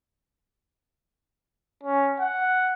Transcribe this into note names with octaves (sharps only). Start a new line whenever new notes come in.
C#4
F#5